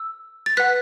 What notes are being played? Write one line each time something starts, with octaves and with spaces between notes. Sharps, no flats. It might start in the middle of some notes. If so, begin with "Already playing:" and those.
Already playing: E6
A6
B4 F#5 F#6 B6